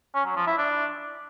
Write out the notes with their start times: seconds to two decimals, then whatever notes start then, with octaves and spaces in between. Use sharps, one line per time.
0.15 C#4
0.25 F#3
0.36 F3
0.47 E4
0.58 D4